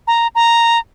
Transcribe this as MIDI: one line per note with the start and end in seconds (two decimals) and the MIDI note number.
0.07 0.27 82
0.35 0.79 82